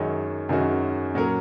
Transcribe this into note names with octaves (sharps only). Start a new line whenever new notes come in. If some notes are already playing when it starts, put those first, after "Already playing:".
Already playing: F#2 D#3 G#3 C#4 F#4
F#2 D#3 G#3 C#4 F#4
A#2 F#3 C#4 A#4